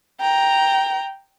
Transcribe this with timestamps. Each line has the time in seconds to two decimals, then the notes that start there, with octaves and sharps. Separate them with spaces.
0.20 G5 A#5